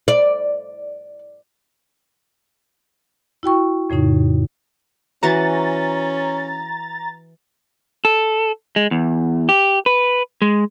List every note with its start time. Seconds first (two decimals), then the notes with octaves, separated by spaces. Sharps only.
0.08 D5
3.43 E4 F#4 G5 C#6
3.90 F2 A2 C#3 D#4
5.23 E3 C#4 F#4 F#5 A#5 A6
8.05 A4
8.76 G#3
8.91 E2
9.49 G4
9.86 B4
10.42 G#3